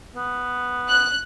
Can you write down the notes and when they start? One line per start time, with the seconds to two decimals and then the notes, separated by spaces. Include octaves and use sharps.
0.16 B3
0.89 F#6